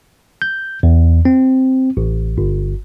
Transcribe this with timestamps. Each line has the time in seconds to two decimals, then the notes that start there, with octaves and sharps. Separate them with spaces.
0.42 G6
0.83 E2
1.25 C4
1.97 A1
2.38 G1